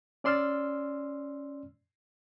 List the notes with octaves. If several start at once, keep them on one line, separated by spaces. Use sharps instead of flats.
C#4 D5 C6 E6 F6 A6